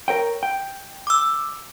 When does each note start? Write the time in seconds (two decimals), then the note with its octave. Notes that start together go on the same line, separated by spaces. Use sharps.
0.08 A#4 C#5 G5
0.43 G5
1.07 D6 E6